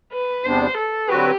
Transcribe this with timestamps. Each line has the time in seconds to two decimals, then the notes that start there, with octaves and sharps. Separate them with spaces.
0.13 B4
0.44 E2 C3 G3 B3 D4 C5
0.77 A4
1.08 D3 F#3 C4 F#4 G4 B4